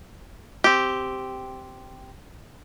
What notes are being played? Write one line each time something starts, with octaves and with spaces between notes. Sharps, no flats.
C4 G4